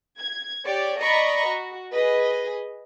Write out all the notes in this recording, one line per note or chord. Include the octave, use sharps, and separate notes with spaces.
G#6
G4 C#5 D5
D5 D#5 A#5 B5 C#6
F#4
G#4 B4 D#5